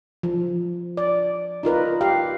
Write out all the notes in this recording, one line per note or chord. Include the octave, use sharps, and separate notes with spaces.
F3
D5
D#4 F4 A#4 B4
G4 F5